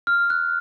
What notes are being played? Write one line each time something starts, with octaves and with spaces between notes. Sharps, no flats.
F6
F#6